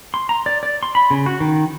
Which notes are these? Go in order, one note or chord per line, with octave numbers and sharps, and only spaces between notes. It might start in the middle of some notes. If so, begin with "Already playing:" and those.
C6
A#5
D5
D5
C6
B5
C#3
F#4
D#3